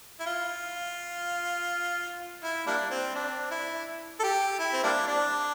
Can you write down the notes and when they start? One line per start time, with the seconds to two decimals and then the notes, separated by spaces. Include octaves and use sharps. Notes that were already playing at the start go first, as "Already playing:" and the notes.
0.20 E4
0.26 F4
2.43 E4
2.67 G3 A#3 D4
2.91 C4
3.15 D4
3.51 E4
4.20 A4
4.23 G4
4.59 E4
4.73 C4
4.83 G3 A#3 D4
5.07 D4